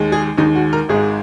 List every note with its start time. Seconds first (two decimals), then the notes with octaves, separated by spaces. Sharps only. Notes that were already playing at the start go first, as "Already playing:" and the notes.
Already playing: D#2 D#3 G#3
0.12 G#4
0.38 D#2 D#3 G#3 D#4
0.56 F#4
0.73 A#4
0.89 G#1 G#2 G#3 G#4